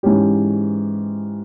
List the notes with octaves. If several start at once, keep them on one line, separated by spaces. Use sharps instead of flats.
G#2 E3 G#3 C#4 G4